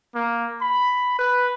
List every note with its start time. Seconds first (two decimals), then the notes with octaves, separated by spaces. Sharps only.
0.15 A#3
0.61 B5
1.19 B4